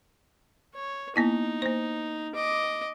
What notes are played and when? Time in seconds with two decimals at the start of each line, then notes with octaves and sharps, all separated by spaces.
0.74 C#5
1.16 A#3 B3 D#4 E4
1.62 A#3 C5
2.35 D#5 D6